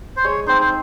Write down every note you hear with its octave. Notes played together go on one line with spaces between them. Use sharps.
C5
G#3 C#5
C4 D#4 C5
C5